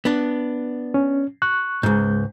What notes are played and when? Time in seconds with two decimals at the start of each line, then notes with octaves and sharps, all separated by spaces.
0.05 B3 D4
0.94 C#4
1.42 C#6 F#6
1.83 C#2 G#2 G#3 G6